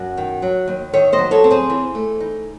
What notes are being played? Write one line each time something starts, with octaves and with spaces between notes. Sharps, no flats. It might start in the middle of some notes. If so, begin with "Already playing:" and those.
Already playing: F#2 F#4
D#3
F#3
D#2
D#3 C#5 E5
C5 D#5
F#3
A4 C#5
C4
G#4 C5
E3
A3
D#4